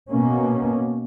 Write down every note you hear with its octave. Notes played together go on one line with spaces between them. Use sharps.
B2 A#3 C#4